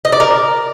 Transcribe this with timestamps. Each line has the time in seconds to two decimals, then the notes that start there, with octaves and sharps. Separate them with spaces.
0.05 D#5
0.12 D5
0.20 A#4